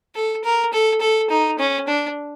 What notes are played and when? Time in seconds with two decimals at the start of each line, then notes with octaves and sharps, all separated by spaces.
0.15 A4
0.44 A#4
0.73 A4
1.01 A4
1.30 D#4
1.59 C#4
1.87 D4